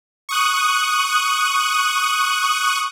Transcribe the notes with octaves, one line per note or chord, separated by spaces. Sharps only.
C#6 D#6 F#6